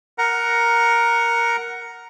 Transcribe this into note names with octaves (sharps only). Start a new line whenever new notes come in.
A#4 F#5 A#5